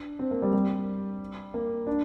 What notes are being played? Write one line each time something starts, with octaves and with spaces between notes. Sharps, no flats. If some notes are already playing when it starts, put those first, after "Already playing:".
Already playing: D4
C4
A#3
G3
G3
A#3
D4